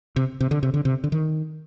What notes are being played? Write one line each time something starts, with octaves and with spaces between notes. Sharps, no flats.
C3
C3
D3
C3
D3
C3
D3
D#3